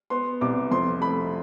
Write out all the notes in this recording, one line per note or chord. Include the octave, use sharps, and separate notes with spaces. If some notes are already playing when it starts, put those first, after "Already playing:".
B3 C6
C2 D6
F2 C6
A3 B5